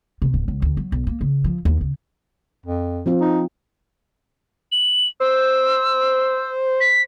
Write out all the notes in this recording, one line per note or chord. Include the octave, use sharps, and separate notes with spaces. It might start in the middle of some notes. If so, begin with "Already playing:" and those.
C3
D1
C#2
D2
F#3
B1
A#3
C#3
F3
D#2
C#3
F2
F3 C4 F4
D#4
F#7
C5 E6
B6